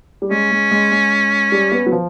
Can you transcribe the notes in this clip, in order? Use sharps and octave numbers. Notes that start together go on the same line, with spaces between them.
G3
G#3 C#4
G#3
G#3
G#3
G3
B3
F#3
F3